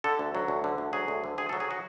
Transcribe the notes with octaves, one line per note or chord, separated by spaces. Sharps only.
D3 A4
D2
F#3
D2
D3
D2
F#3 G#4
D2
D3
D2 G#4
A4
F#3
G#4
F#4